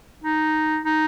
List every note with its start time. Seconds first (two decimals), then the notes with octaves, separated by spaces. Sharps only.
0.24 D#4
0.86 D#4